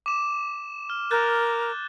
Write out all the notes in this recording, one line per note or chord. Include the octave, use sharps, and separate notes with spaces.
D6 E7
F6
A#4 F#6 G6 A6